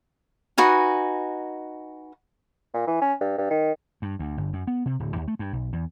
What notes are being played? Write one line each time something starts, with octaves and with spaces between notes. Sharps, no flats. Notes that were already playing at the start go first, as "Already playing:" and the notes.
D#4 F#4 B4 G#5
A#2
E3
C#4
G2
G2
D#3
G2
D2
G1
F#2
B3
C3
D1
D#2
A3
G2
B1
E2